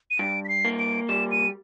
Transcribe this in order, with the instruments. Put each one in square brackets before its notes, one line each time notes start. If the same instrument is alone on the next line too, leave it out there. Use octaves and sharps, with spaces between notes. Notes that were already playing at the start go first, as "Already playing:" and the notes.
[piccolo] D#7
[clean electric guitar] G2 [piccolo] D7
[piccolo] B6
C7
[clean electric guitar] A#3
[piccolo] D7
[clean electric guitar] G3 [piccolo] E7
[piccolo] D#7